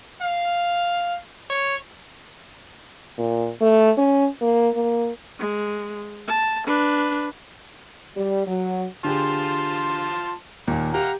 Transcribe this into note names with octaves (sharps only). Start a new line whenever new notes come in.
F5
C#5
A#2
A3
C#4
A#3
A#3
G#3
A5
D4 B4
G3
F#3
D3 F4 G4 G#4 A5 C6
D#2 A#2
G4 F5 F#5 A#5